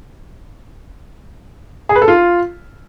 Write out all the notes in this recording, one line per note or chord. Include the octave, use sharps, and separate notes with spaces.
G#4
B4
A4
F4